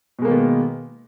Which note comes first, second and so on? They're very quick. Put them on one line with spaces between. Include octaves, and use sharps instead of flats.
B2 G#3 A#3 D#3 B3